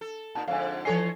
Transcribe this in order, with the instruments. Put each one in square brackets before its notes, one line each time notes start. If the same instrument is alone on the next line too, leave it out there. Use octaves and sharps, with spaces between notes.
[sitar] A4
[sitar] A#2 [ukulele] D#4 A5
[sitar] F2 G#2 D3 [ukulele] F5 G#5
[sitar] E3 C#5 D#5 [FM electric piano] F3 A4 C7 [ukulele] G#5